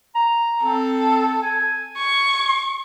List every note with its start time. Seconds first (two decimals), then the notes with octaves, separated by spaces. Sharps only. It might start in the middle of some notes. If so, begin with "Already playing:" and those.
0.15 A#5
0.63 C4 A4
1.42 G#5
1.98 C#6